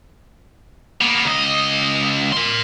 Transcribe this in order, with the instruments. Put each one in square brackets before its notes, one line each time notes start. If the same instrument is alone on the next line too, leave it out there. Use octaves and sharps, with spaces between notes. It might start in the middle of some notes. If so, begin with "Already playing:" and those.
[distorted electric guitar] A#3 B3
C#2 D#5
A#4 C6